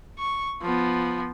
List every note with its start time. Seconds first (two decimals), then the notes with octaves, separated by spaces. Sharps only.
0.19 C#6
0.62 F3 B3